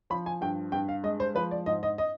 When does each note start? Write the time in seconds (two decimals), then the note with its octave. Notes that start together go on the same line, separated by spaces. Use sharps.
0.10 F3 B5
0.26 G#5
0.41 G2 G5
0.72 G2 G5
0.88 F5
1.03 G#3 D#5
1.20 C5
1.35 F3 B4
1.51 D5
1.66 G#2 D#5
1.83 D#5
1.98 D#5